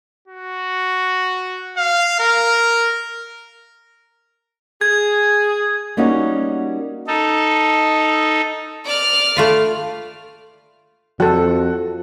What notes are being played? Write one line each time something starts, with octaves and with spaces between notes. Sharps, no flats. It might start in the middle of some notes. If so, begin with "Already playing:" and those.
F#4
F5
A#4
G#4 G#6
G3 A#3 C#4 D#4 F#4
D#4 A4
D5 F6
A3 F4 B4
F2 F3 F#4 A4